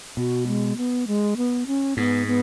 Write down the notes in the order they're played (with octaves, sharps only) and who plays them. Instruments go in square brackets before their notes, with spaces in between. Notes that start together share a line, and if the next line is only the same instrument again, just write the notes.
[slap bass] B2 [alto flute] F#4
[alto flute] G#3
B3
G#3
B3
C#4
[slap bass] G#2 [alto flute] B3
[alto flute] B3